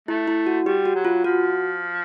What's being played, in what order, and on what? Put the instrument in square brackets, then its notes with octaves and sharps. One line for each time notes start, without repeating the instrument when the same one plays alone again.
[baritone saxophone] A3 [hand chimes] E4
[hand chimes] E4
F#4
[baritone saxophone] G3 [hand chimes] G4
[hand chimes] F#4
[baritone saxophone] F#3
[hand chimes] F4
[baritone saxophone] F3 [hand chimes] F#4